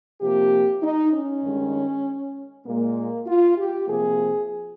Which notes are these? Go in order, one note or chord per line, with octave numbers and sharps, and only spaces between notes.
C3 F3 A#3 G4
D#4
C#4
G2 D#3 G#3
A#2 G#3 A#3
F4
G4
C3 F3 A#3 G#4